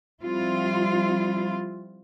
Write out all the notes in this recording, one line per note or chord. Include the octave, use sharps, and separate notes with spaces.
F3 G3 C4 E4 F4